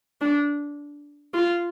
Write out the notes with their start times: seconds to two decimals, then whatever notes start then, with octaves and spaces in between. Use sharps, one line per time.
0.21 D4
1.34 F4